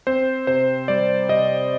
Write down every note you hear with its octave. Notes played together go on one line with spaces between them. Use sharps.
C4 C5
C3 C5
G3 D5
C3 D#5